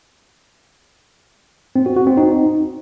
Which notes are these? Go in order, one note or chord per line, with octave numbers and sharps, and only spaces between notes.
C4
F#4
F#4
C4
D#4